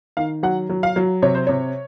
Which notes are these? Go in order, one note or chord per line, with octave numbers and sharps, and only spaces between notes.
D#3 F5
F#3 F#5
F#3
F5
F#3
C3 C#5
C5
C3 C#5